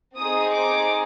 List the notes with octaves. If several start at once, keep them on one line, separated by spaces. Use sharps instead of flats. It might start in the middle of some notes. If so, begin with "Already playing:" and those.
C4 D#4 G#4 D#6
D6